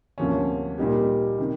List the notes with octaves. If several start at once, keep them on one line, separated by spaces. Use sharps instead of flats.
D2 C3 F3 A#3 C#4
A#2 G3 A#3 D#4 G4
C3 D#3